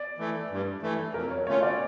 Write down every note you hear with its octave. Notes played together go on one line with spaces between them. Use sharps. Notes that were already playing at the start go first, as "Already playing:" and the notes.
Already playing: D5
E3 A3
G2
E3 A3
F2 A#4
C#5
D3 A3 C#4 F4 C#5
D5